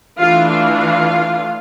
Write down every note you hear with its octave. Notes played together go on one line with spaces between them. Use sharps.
E3 A3 D4 F4 F5
F4 F5